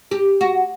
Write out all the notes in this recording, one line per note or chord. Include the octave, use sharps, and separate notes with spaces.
G4
F#4